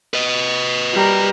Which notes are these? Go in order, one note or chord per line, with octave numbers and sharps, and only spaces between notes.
B4 D#5
G3 A#4